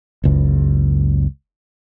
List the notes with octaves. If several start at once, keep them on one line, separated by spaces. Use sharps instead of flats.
F#1 C#2